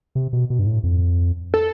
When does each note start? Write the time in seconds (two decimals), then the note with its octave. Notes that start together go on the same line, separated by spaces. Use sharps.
0.15 C3
0.33 B2
0.50 B2
0.59 G2
0.67 A2
0.83 F2
1.54 A4